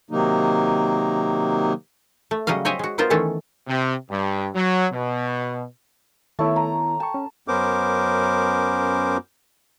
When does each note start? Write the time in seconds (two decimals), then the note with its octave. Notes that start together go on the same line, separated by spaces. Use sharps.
0.11 C3 D#3 F#3 A#3 D#4
2.31 A3
2.47 C#3 F#3 G3 D#5 F5
2.65 C5 C#5 D#5 E5 G5 G#5
2.79 G#3 F#4
2.98 G3 B3 F4 A#4 C5
3.10 D#3 E3 A3 C#4 A4
3.67 C3
4.10 G2
4.54 F#3
4.91 B2
6.39 D#3 A3 B3 E4 C#5 E5 A5
6.56 A#5
7.00 G5 A5 C#6
7.14 C#4
7.48 F#2 B3 C#4 A#4 C5 D6